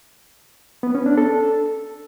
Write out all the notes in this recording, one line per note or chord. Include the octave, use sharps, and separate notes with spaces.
B3
C#4
D4
A4